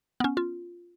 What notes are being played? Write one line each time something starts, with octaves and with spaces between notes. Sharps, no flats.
B3 C#4
F4